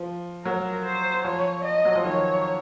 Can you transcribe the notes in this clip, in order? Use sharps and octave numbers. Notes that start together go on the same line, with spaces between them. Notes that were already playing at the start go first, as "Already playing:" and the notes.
Already playing: F3
F#3 A#4
C5
F3 C#5
D#5
F#3
F3
D#3 C#5